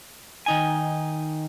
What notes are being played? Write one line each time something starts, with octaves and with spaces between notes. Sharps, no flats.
D#3 D#4 G#5